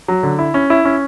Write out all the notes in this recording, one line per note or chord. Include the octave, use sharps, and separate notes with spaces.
F#3
D3
E4
C#4
E4
C#4